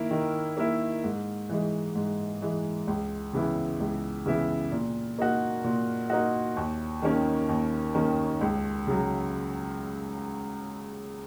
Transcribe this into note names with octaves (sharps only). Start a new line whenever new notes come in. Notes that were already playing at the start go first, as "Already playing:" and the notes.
Already playing: D#3 A#3 E4
D#3
A#3 E4
G#2
E3 G#3
G#2
E3 G#3
C#2
C#3 E3 B3 E4
C#2
C#3 E3 B3 E4
A#2
A#3 D#4 F#4
A#2
A#3 D#4 F#4
D#2
D#3 A#3 C#4
D#2
D#3 A#3 C#4
C#2
C#3 F#3